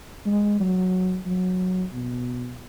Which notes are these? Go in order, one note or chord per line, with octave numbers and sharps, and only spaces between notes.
G#3
F#3
F#3
B2